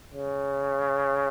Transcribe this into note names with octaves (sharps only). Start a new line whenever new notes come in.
C#3